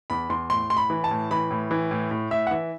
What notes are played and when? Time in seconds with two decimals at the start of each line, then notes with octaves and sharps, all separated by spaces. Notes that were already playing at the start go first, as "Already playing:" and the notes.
0.10 E2 B5
0.30 E2 C6
0.50 A2 C6
0.70 A2 C6
0.77 B5
0.90 E3
1.04 A5
1.11 A2
1.31 E3 B5
1.51 A2
1.71 E3
1.91 A2
2.11 A2
2.31 A2 E5
2.47 F#5
2.51 E3 E5